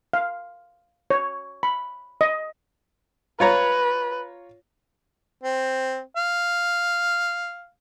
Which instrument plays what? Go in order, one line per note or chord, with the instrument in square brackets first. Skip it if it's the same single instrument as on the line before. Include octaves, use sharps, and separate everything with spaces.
[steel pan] F5
C#5
B5
D#5
[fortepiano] F4 C#5 A#5 [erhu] B4
[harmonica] C4
F5